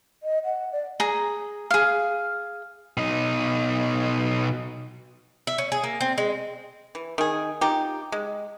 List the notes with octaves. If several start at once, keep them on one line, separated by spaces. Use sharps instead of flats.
D#5
F#5
D5
G#4 A#5
G#4 F5
B2 D#4
E5
C#4
G#4
A#3
C4
G#3
E3
D#3 G#4
D#4 F4 G4
G#3